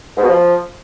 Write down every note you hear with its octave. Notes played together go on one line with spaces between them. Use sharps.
G#2
B2
F3